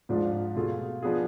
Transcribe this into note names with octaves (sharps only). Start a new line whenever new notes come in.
G#2 F3 G#3 D4 F4
B2 A3 F4 G#4
F3 B3 D4 G#4